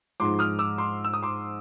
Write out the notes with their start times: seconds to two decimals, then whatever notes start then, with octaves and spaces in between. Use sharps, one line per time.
0.20 G#2 F3 G#3 C6 D6
0.39 D#6 F6
0.59 D6 E6
0.78 C6 D6
1.04 E6
1.14 D#6
1.23 C6 D6